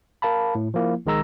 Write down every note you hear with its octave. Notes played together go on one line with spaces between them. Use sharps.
A#4 F5 A5 B5
A2
F3 A#3 E4
A#1 D#3 G#3 A#5 E6 A#6